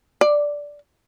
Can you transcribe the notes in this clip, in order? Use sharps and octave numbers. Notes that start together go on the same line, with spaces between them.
D5